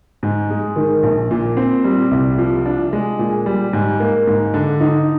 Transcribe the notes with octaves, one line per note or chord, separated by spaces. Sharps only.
G#2
G#3
D#3
A#1
A#2
C4
G3
C2
F3
D4
G#3
A#2
G3
G#2
A#3
G#2
D3
D#4